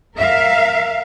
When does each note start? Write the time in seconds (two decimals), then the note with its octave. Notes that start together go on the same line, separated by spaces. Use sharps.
0.17 A#4 E5 F5